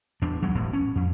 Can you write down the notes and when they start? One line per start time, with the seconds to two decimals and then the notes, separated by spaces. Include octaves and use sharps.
0.22 E2 D4
0.42 D#2 F#3 G#3
0.54 E1 A2
0.73 C#4
0.96 F2